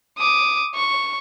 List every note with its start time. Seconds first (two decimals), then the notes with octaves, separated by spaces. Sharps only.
0.18 D6 D#6
0.75 C#6